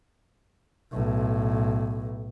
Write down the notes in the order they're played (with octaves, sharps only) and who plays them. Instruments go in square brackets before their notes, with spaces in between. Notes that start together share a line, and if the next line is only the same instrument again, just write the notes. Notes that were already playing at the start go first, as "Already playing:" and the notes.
[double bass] B1 A2